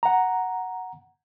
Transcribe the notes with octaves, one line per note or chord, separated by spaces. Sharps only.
F#5 A#5